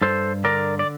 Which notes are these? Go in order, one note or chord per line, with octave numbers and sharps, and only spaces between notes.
G2 A4 C5
D3 A#4 D5
D5